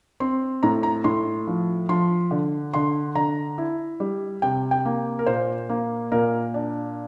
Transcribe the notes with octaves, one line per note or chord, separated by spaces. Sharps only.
C4 C6
A2 A#5
A#5
A2 C6
F3
F3 C6
D3
D3 C6
D3 A#5
E4
G3
C3 G5
G5
A#3
A#4
A#2 C5
A#3
A#2 A#4
D4